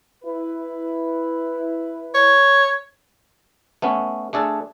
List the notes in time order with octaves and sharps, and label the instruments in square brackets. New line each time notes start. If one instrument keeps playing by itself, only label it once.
[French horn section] E4 B4
[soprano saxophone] C#5
[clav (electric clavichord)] A3 B3 C#4
A3 D4 G#4 A4